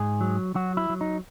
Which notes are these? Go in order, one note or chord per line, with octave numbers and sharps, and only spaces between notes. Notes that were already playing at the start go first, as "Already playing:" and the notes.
Already playing: G#2 G#4
F#3
F#3 F#4
E4
F#3
D#4